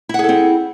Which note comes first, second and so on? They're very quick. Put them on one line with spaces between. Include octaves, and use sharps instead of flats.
E4 F#5 G#4 A4 C4